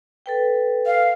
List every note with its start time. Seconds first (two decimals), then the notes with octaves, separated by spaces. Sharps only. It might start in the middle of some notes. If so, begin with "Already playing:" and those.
0.26 A4 B4 G5
0.86 F5